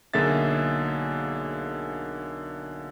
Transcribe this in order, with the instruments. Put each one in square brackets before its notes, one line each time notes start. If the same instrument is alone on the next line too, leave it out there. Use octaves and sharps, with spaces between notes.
[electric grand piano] B1 D3 A#3 G#4 E5 A6